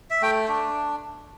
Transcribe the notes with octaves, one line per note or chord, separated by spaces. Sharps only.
E5
A3 G5
D4